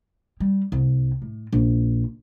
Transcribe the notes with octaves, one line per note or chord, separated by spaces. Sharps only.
G3
C2
A2
A#1